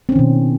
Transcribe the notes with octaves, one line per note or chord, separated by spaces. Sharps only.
B2 D#3 C4 C#4